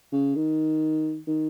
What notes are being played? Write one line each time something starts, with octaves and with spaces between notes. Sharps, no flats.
C#3
D#3
D#3